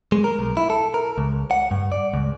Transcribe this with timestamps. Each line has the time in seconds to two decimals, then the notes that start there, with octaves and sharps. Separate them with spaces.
0.12 G#3
0.24 A#4
0.39 B1
0.57 E4
0.70 A4
0.94 A#4
1.18 C#2
1.51 F#5
1.71 G2
1.92 D5
2.14 C#2